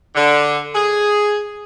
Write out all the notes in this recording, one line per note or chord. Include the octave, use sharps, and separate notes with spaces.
D3
G#4